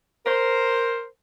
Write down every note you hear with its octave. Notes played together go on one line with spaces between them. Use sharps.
A#4 C5